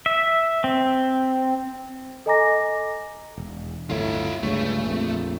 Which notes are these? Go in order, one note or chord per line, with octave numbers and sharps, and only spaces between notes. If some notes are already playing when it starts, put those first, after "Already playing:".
E5
C4
A4 D#5 G#5 A#5 D6 A#6
E1
D1 G1 A2 F4 E5
C#2 G2 C#3 A3
A#1 F2